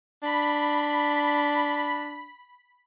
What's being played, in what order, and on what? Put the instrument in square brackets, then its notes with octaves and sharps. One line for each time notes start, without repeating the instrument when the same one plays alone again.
[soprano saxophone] D4 [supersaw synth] B5 B6